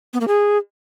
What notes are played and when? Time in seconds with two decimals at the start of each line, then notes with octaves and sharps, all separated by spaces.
0.13 B3
0.21 A#3
0.28 G#4